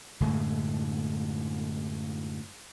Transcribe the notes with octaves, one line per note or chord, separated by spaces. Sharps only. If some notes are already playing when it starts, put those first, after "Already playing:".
F#2 A2 D3 G#3